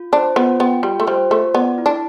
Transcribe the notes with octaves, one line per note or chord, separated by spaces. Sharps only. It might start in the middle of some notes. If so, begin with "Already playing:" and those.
Already playing: F4
D4 C5
B3 F4
B3 G5
G3 F4
A3
G3 C5
A3 F4
B3 D5
E4
D4